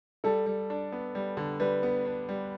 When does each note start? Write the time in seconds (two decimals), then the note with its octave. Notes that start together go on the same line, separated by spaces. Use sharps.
0.24 G3 A4
0.46 G3
0.70 D4
0.92 B3
1.15 G3
1.37 D3
1.60 G3 B4
1.83 B3
2.05 D4
2.29 G3